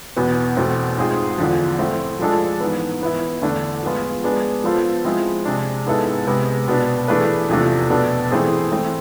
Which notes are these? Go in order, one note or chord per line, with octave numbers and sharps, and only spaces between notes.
E2 B2 B3
E2 B2 A3 C4
G#2 G#3 C4 F4 G#4
E2 D3 F3
A3 C4 E4
F3 G#3 D4 A4
G#2 E3 B3
E3 B3 E4
E2 D3 A3 D4
F3 G#3 B3 F4
G#3 B3 D4 G#4
F3 B3 F4 A4 C5
F3 G#3 C4 E4
C3 G#3 D4
G#2 G#3 B3 E4 A4
C3 G#3 B3
B2 B3 D4
E3 A3 D4 G#4 B4
E2 C3 F3 A3 D4
B2 B3 D4 A4 D5
E3 A3 C4 G#4
E3 A3 C4